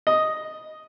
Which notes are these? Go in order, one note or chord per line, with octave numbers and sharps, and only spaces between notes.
D#5